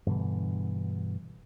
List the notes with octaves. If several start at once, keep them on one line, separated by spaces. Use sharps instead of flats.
G2 B2 D3 E3